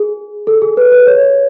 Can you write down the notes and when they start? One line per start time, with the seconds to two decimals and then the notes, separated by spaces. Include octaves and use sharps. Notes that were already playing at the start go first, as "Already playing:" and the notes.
Already playing: G#4
0.47 A4
0.62 G#4
0.77 B4
0.92 B4
1.07 C#5